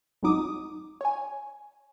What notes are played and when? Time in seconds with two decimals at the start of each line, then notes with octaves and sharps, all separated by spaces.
0.23 G#1 F2 F#3 D#4 D6 D#6
1.01 C#5 G#5